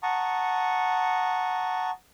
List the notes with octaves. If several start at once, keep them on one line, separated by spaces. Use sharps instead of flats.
F#5 A5 A#5 C#6 D#6